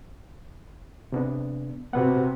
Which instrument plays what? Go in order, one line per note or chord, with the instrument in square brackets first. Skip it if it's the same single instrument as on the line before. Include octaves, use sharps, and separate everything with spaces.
[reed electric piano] C3 B3 D4
[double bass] C3 [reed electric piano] F#4 B4 F#5